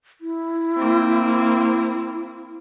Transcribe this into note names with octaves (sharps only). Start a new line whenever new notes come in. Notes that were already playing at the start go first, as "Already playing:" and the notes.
E4
A#3 C4